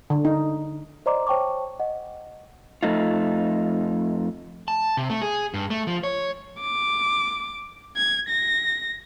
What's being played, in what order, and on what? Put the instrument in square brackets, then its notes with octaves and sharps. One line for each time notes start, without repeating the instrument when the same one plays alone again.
[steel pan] D3
D#4
[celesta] C5 D5 D#5 A#5 C6 D6
C5 C#5 G5 A5 C#6 D6
D#5 F#5
[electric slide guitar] F2 A3 D#4 F4
[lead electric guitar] A5
C3
A3
G#4
G2
A3
F3
C#5
[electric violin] D6
G#6
A#6